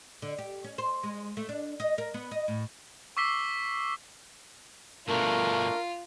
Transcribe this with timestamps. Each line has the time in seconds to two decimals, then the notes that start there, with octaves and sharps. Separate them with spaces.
0.22 D3
0.39 G4
0.64 C#4
0.78 C5
1.03 G#3
1.37 A3
1.49 D4
1.80 D#5
1.98 A#4
2.14 B3
2.31 D#5
2.48 A2
3.17 C#6 D6 E6 B6 C7 G7
5.08 G2 B2 A3 D4 F4 A#4